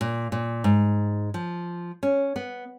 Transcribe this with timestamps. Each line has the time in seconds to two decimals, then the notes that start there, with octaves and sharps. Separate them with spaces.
0.01 A#2
0.32 A#2
0.64 G#2
1.34 F3
2.03 C#4
2.36 B3